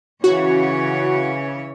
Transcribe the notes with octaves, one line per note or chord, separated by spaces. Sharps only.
C#3 E3 F#4 C#5